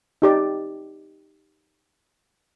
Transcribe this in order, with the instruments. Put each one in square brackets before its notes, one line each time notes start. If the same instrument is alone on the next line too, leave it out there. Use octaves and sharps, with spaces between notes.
[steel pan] D#4 G4 D5